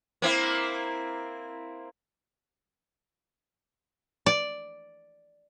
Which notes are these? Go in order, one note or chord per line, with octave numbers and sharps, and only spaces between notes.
A#3 C4 E4
D5